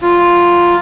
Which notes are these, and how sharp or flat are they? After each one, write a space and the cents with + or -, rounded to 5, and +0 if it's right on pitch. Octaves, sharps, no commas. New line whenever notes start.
F#3 +0 F4 +0